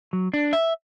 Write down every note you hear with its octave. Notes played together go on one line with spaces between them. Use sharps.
F#3
D4
E5